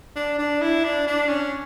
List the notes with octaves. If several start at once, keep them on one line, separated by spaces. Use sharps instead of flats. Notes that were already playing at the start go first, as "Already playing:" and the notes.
D4
D4
E4
D4
D4
C#4